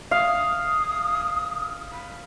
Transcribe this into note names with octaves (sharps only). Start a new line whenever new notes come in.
F5 D#6
B5